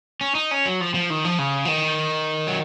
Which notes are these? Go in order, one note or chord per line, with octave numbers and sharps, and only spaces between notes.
C#4
D#4
C#4
F#3
F3
F3
D#3
F3
C#3
F3
D#3
F#3